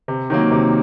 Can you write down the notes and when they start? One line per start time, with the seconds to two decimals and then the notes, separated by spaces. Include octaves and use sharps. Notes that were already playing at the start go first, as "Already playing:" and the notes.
0.08 C3
0.30 D#3 F#3 A#3
0.51 C3